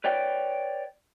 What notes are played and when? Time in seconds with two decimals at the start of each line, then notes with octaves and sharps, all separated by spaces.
0.04 B4 C#5 D5 G5